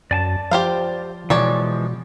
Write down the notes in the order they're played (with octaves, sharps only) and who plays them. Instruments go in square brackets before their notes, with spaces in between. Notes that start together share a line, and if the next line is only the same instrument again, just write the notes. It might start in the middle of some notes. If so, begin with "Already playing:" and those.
[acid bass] F#2 [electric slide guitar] D5 G#5 A5
[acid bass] F3 [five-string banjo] G4 C5 F5
[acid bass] B2 [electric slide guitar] E3 F3 G#3 [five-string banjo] C#5 D5